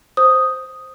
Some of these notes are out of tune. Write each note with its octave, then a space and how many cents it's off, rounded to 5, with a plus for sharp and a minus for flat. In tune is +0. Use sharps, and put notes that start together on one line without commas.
C5 +0 D#6 +0